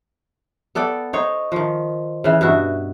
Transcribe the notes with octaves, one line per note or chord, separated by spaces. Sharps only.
B3 A4 D5 G5
D#4 C5 C#5
D#3 F3
C#3 E3
G2 B2 F#4 E5